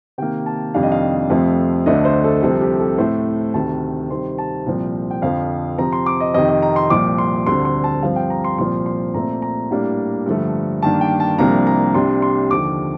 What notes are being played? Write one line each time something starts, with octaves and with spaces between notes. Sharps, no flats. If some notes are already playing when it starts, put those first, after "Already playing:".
C3 D#3 A#3 G5
A5
F2 C3 D#3 G3 D4 F5
D#5
F5
F2 C3 F3 A3 C4
D2 D3 A3 D4 D#5
C5
A4
C2 C3 F3 C4 A4
G4
A4
A2 A3 C4 C5
D2 C3 D#3 A5
C3 D#3 G3 C4 C6
A5
C2 A#2 F3 C4
G5
F2 D3 F3 C4 F5
C3 F3 C4 A#5
C6
D6
D#5
F2 C3 D#3 D#5
D#5
A#5
C6
C2 A#2 F3 D6
C6
D2 D3 G3 C4 C6
C6
A5
G2 F3 C4 F5
G5
A#5
C6
C2 A#2 F3 C4 C6
C6
A#2 A3 C4 A#5
A#5
A2 G3 A#3 D4
G2 D3 F3 A3
G2 D#3 A#3 D4 A5
G5
A5
C2 C3 F3 A#3 D4 A#5
A#5
C2 C3 G3 D4 C6
C6
D#2 D3 F3 D6